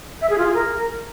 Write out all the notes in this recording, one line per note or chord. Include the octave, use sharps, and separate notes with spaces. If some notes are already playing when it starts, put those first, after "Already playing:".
E5
G#4
F4
G#4
A#4